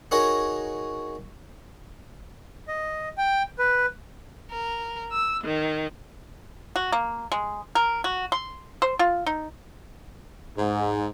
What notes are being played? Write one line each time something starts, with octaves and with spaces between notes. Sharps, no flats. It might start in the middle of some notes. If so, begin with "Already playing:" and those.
D#4 F#4 G#4 A#4 C#5
D#5
G5
B4
A#4
E6
D#3
F#4
A#3
G#3
A#4
F#4
C6
C5
F4
D#4
G#2